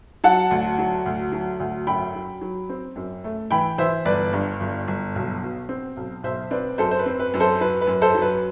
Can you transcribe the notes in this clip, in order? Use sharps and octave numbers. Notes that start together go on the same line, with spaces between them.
F#3 F#5 A5
D2
F#3
D2
F#3
D2
F#2 G5 B5
F#3
F#3
C4
F#2
A3
E3 G5 B5
E3 C5 E5
G1 B4 D5
G2
G1
G1
B1
B2
C4
B1
B1 C5 E5
C4 B4 D5
F#2 A4 C5
C5
B4
C4
B4
F#2
A4 C5
F#3 B4
B4
F#2
A4 C5
F#3
B4